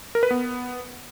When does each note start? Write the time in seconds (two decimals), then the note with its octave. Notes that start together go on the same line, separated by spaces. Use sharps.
0.15 A#4
0.23 B4
0.31 B3